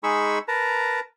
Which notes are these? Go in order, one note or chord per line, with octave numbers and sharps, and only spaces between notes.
G#3 D#4 G#4 B5 C#6 E6
A#4 B4 A5 A#5